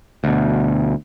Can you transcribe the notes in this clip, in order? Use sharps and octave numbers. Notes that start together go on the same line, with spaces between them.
D2 B2